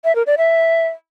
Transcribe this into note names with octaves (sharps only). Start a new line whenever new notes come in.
E5
A#4
D5
E5